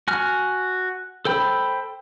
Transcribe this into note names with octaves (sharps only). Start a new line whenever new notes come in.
F#4 G#5 F6
A4 C5 G5 B5